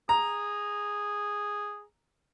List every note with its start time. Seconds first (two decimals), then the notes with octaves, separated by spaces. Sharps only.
0.09 G#4 A#5